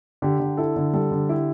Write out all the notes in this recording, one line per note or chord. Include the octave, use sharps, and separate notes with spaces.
D3 G4
D3
E4 A4
D3
G3 A4
D3
E4 G4